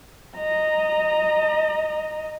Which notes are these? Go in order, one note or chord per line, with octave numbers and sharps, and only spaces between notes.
D#5 A#5